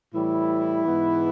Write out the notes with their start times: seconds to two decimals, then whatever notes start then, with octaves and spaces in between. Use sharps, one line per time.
0.14 A2 E3 G3 E4
0.85 G#2 E3 G#3 B3